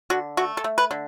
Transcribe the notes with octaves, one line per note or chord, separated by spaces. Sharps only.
D3 F#4
A3 F#4
A4
A3
B4
D3